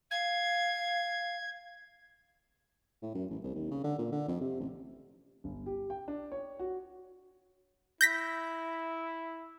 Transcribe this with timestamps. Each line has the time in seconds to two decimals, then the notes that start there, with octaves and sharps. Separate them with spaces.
0.11 F5 G#6
3.02 A2
3.14 F#2
3.30 A1
3.44 C2
3.55 D#2
3.71 C#3
3.84 D3
3.99 A#2
4.12 D3
4.28 F2
4.41 C3
4.60 A1
5.44 G1
5.66 G4
5.90 G5
6.08 D4
6.32 C#5
6.59 F#4
8.01 E4 G6 A#6 B6